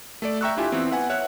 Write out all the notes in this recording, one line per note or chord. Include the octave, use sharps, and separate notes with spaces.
A3 A4 D5
E5 G5 A#5 C#6 E6 F#6
D4 E4 F4 G4 E5 G#5
E3 B3 C4
B4 F#5 G#5
C#5 E5 F#5 F#6